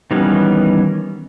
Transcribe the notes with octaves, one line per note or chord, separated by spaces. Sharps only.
D#3 E3 G3 B3 C#4